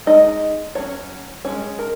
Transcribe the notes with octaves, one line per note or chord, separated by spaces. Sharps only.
G#3 D#4 D#5
F#3 C#4 C#5
G#3 C#4 C#5
A#4